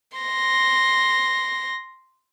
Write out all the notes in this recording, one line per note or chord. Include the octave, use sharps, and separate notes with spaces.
C6 A#6